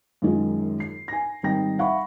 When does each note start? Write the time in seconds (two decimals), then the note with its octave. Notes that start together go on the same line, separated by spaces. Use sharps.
0.22 F#2 D#3 G#3 C#4 F4
0.80 C7
1.08 G#5 A#6
1.43 G#1 G3 D#4 G5 A#6
1.79 E5 F#5 B5 C#6